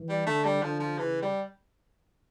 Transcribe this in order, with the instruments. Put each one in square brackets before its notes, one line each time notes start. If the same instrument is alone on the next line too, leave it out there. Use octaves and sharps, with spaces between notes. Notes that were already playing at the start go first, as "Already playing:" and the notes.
Already playing: [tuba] E3
[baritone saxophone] G3
[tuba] D3 [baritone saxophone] A3
[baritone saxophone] G3
[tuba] D3 [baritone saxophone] F3
[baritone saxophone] F3
[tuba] C#3 [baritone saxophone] E3
[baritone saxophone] G3